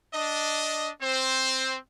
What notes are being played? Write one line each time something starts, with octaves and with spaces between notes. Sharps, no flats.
D4 D#5
C4 C5